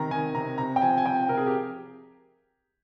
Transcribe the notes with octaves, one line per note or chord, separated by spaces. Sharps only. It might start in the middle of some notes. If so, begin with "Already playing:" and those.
Already playing: C3 D#3 A#5
D#3 G#5
C3 A#5
C3 A#5
G5
F3 G#5
G#5
F3 G5
C3 A#4
G#4
G4